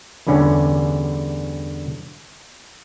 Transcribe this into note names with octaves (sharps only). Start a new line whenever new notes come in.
E2 G2 D3 C#4